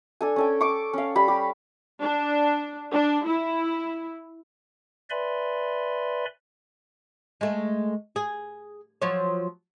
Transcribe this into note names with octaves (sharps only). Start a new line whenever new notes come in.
D4 A4 G#5
C#4 A4 G5
C#6 D6
C#4 F5
G3 B5
G4
D4
D4
E4
B4 D5 E5 G#5 B5 C6
G#3 A3
G#4
F3 F#3 C#5